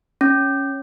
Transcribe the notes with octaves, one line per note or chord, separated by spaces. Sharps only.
C#4